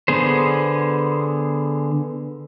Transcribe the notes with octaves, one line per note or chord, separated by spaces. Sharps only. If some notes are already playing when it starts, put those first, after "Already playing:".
D3 B3 G#4 C5